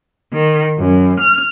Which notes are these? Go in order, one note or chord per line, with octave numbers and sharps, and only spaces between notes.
D#3
F#2
F6